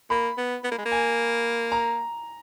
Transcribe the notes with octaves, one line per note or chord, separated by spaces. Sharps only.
A#3 B5
B3
B3
A#3
G#3
A#3
G#5
A#5